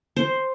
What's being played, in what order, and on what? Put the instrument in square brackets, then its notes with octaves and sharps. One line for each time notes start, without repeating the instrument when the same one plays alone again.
[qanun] C5